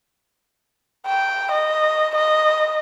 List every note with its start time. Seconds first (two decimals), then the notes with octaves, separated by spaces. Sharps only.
1.07 G5
1.52 D#5
2.16 D#5